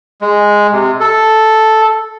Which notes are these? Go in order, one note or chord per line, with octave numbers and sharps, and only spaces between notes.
G#3
C3
A4